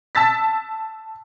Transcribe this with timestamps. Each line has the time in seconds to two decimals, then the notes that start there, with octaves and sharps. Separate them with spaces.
0.15 A5 E6 A6 B6